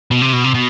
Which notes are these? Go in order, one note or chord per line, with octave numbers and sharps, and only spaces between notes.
B2
C3
B2
C3
B2